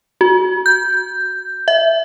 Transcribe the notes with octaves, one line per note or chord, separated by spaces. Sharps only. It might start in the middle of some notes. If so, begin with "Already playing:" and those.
F#4
G6
E5